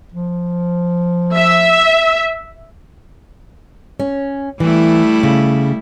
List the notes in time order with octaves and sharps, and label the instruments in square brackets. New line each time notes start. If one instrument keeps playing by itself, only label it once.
[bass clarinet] F3
[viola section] E5
[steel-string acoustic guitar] C#4
[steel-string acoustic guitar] E3 [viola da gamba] G3 A3 E4
[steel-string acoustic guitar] C#3